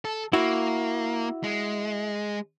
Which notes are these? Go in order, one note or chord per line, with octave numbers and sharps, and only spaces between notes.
A4
A#3 E4 F#4
G#3